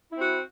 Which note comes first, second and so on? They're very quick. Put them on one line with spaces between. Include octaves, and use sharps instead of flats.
E4 C4 F#4